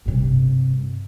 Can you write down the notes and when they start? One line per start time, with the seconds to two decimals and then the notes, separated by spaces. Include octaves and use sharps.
0.06 G2 C3